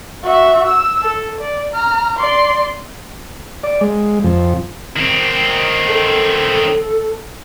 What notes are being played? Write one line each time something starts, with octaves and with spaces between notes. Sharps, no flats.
F#4 E5
E6
A4
D5
A#5 F6
D5 C6
D5
G#3
F2
D#3 C4
A4